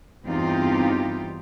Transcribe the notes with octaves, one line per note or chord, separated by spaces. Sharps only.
E2 G2 C4 D#4 F4 G4